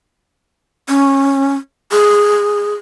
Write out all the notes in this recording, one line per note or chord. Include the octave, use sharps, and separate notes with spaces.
C#4
G#4